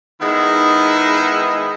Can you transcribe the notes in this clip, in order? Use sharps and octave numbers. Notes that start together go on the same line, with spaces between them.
D#3 G#3 B3 D#4 E4